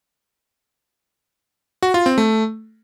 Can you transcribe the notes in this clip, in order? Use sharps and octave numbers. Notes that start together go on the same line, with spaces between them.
F#4
F4
C4
A3